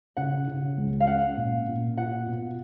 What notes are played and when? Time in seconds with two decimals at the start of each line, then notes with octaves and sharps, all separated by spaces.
0.17 C#3 F#5
0.48 C#3
0.78 C#2
1.00 F5
1.07 C#4 F#5
1.37 A#2
1.67 A#2
1.97 F4 F#5
2.26 B2